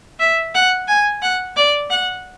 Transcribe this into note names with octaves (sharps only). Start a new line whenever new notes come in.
E5
F#5
G#5
F#5
D5
F#5